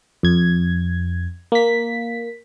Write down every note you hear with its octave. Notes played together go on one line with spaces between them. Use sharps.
F2 G#6
A#3 B6